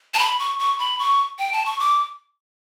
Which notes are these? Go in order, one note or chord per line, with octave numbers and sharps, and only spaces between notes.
A5
B5
C#6
C#6
B5
C#6
G5
A5
C#6
D6